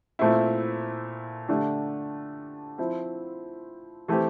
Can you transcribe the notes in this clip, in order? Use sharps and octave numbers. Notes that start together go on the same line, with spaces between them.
A#2 A3 C4 E4
D3 A3 D4 G4
F3 C4 E4
E3 A3 C4 G4